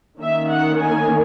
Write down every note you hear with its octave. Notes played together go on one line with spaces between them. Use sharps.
D#3 A#3 C#4 E5
F#5
G#5